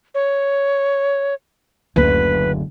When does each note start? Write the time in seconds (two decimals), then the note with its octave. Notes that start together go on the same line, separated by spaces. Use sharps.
0.14 C#5
1.96 F#1 D2 B4